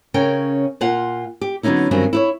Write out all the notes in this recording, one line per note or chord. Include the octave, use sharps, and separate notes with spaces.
C#3 C#4 A#4 G5
A#2 F4 F5 F#5
G4
D3 F#3 B3 C#4 D#4 E4
G2 D#3 F#3 C4 C#4
E4 B4 C#5